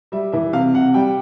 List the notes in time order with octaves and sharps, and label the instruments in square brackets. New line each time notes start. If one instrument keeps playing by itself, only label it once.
[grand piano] G3 E5
E3 E5
C3 F5
C3 F#5
G3 G5